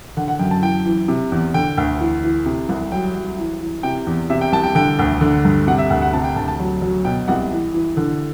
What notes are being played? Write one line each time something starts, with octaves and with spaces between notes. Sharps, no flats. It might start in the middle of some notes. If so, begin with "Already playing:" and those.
D3 F#5
F#5
F#2 G5
A5
E3 G5
E3
C3
E2
D3 G5
D2
E3
E3
C3
C2
F#3 G5
F#3
E3
E3
C3 G5
E2
C3 E5
G5
C2 A5
G5
D3 G5
D2
D3
G2
C3 F#5
E5
D2 F#5
F#5
C3 A5
G5
D2 A5
A5
F#3
F#3
B2 G5
C2 F#5
E3
E3
D3